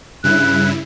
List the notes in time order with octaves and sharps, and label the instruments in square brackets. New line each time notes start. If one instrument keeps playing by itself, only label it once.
[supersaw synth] G2 C#3 E4 [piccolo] F#6